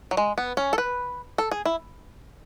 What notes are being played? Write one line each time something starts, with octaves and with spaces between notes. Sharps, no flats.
F#3
G#3
B3
C#4
A4
B4
A4
G#4
E4